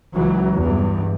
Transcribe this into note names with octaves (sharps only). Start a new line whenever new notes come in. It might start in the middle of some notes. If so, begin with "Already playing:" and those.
C#2 E3 F#3
E2 G2